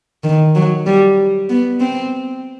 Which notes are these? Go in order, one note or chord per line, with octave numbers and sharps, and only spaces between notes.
D#3
F#3
G3
B3
C4